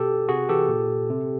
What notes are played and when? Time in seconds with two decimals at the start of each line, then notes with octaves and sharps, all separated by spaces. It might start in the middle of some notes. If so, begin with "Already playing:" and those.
Already playing: B2 G4 A4
0.29 C3 F#4 G#4
0.49 E3 G4 A4
0.69 A#2
1.10 C3